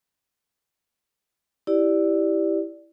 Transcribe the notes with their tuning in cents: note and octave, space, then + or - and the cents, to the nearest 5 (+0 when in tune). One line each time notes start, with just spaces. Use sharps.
E4 +0 G4 +0 D5 +0